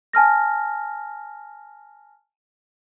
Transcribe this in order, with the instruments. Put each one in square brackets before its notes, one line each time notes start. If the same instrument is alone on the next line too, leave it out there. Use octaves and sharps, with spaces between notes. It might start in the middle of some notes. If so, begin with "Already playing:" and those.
[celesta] G#5 A5 F6 A#6